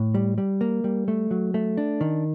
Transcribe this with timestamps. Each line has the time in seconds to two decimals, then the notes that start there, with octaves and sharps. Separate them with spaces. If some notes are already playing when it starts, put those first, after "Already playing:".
Already playing: A2
0.14 G3
0.38 G3
0.61 A#3
0.84 G3
1.08 A3
1.31 F#3
1.54 A3
1.77 D4
2.01 D#3